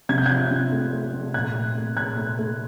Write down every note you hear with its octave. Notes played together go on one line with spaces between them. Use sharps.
C3 G#6
G6
F3 F#6 G#6
C3
A3
A3
C3
A#2 F#6 G#6
A#2
A3
A#2 F#6 G#6
A3
A3